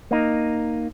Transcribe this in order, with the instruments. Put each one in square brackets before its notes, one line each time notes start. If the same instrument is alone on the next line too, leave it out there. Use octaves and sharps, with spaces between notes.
[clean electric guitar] A#3 D#4